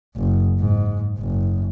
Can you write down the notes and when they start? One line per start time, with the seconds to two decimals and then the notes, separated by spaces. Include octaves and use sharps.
0.17 F#1
0.60 G#2
1.19 F#1